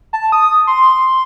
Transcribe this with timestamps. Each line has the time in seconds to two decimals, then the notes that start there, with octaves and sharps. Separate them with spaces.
0.13 A5
0.32 D#6
0.67 C6